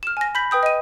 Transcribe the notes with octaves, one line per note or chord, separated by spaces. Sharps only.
F6 E7
G#5 A#6
B5 G6 B6 F#7
B4 G5 D#6 G6
D#5 D#7